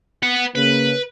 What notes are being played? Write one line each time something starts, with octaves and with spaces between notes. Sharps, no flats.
B4 F#5
C#3 A#3 B4